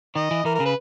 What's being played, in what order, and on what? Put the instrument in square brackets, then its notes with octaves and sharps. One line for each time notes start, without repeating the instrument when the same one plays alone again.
[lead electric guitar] D#3 [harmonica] D#5
[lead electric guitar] E3
[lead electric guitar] E3 [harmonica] A#4
[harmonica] A#4
[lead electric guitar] C#3
[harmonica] B4